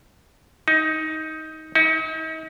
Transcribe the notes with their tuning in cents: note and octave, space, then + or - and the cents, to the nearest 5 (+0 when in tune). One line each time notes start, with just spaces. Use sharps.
D#4 +15
D#4 +40